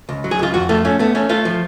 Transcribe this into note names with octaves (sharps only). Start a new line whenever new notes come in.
C#2
F#3
G#4
C#2 F4
F2 F#4
A3 F4
A3 C#4
A3 B3
A3 C#4
A3 F4
F3